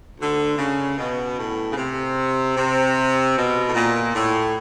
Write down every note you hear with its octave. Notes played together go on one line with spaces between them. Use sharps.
D2 D3
C#3
B2
A2
C#3
C3
C3
B2
A2
A#2
A2